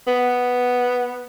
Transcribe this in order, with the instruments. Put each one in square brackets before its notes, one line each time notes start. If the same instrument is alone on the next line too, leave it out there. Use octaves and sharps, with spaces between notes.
[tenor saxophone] B3